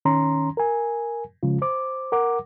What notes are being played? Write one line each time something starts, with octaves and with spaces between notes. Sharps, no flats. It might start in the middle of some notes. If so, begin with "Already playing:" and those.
D#3 C#4 A#5 C6
A#4 G#5
C#3 F3 G#3 F4
C5 D6
A#4 F#5 D6